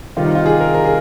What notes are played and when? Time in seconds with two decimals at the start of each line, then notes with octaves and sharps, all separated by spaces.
0.16 C3 D#3 G3 F4
0.26 D#4
0.35 F4
0.46 G#4
0.61 A#4
0.74 A#4
0.84 G#4